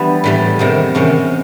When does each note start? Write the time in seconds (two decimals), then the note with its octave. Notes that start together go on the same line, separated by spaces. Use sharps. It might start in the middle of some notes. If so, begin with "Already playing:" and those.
Already playing: E3 G3 B3 D4
0.24 A2 E3 G3
0.59 E2 C3 D#3
0.95 E2 C3 D#3 C#4